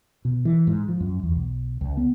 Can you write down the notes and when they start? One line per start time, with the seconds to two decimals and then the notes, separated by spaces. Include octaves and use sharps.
0.25 B2
0.45 E3
0.67 G#2
0.88 F3
1.00 F#2
1.23 E2
1.35 B1
1.81 C#2
1.97 B3